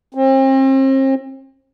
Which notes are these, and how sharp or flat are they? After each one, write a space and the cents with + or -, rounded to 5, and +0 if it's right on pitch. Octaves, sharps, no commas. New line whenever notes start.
C4 +40